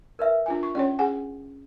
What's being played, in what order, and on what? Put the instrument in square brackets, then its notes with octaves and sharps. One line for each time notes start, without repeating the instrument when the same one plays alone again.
[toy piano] A#4 B4 E5
[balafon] D4 F4 G#5
C#6
[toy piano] C#4 G4 [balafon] C#5 D5
[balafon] G#4 F#5 G#5